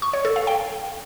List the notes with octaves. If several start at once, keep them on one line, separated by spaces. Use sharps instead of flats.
C#6
C#5
A4
F5
G5